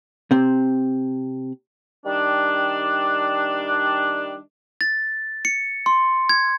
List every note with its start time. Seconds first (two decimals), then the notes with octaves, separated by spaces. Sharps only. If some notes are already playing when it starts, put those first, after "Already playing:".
0.31 C3 C4
2.04 D#3 G3 D4
4.81 A6
5.45 C#7
5.86 C6
6.29 G#6